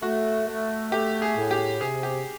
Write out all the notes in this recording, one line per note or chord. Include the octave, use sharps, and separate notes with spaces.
A3 F#4
A3
A3 G4
G#4
A2
G4
C3 G#4
G4